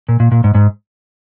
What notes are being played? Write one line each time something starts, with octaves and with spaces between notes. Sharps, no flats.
A#2
A#2
A#2
G#2
G#2